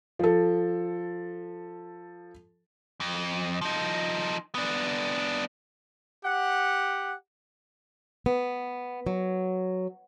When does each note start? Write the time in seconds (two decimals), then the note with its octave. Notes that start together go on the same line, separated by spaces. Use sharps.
0.19 F3 A4
3.00 F2
3.61 F3 D#4
4.55 B3 D4
6.25 G4 F#5
8.26 B3
9.07 F#3